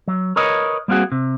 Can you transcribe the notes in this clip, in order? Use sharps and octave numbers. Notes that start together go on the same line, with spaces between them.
F#3
A#4 B4 C#5 D#5
G3 A#3 C4 F#4 G#4
C3